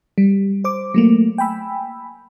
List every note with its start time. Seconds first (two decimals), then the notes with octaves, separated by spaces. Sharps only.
0.18 G3
0.64 C5 D6
0.94 F#3 A3 A#3
1.38 G5 G#5 B5 E6